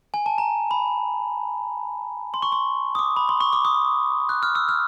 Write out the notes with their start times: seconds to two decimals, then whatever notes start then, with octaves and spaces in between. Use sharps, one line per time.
0.14 G#5
0.26 A5
0.38 A#5
0.71 B5
2.34 C6
2.42 C#6
2.52 C6
2.95 D#6
2.99 D6
3.16 B5
3.29 C6
3.40 C#6
3.53 D6
3.65 D#6
4.29 F#6
4.43 F6
4.55 E6
4.69 F6